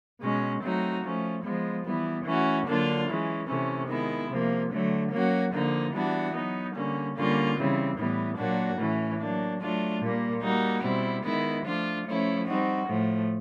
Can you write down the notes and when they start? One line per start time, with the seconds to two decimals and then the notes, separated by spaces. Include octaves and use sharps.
0.22 B2 G#3 C#4
0.62 F#3 A3 C4 D#4 F#4
1.04 F3 A3 C#4
1.44 F3 G#3 B3
1.85 E3 G3 B3
2.26 E3 A3 C#4 F#4
2.67 D3 F#3 A#3 D4 F4
3.08 E3 G#3 C#4
3.49 C3 E3 A3 C#4
3.89 D#3 G#3 B3 E4
4.30 C3 F3 A#3
4.72 D3 F#3 A3
5.12 F#3 A#3 C#4 F#4
5.53 D3 F3 A#3 D#4
5.94 E3 G3 B3 D4 F#4
6.35 F#3 B3 D#4
6.75 D3 G3 A#3 C#4
7.17 D3 G3 A#3 C#4 F4
7.57 C#3 E3 G3 C4
7.98 A2 E3 G3 B3
8.38 A#2 F#3 A#3 D4 F#4
8.79 A2 E3 A3 C#4
9.20 F#3 A#3 D4
9.61 F#3 A3 D4 F4
10.02 A#2 G3 A#3
10.43 G3 A#3 D#4 F#4
10.84 B2 G3 C4 E4
11.25 D#3 G#3 B3 E4
11.66 F3 A3 D4 F4
12.06 F3 A3 C#4 E4
12.48 G3 C4 D#4 F#4
12.88 A2 F3 A3